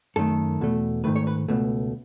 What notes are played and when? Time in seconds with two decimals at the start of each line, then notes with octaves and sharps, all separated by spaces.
0.16 F#2 D#3 A3 A4
0.61 E2 B2 A3
1.04 G#2 D#3 A3 B4
1.16 C#5
1.27 B4
1.48 C#2 B2 A3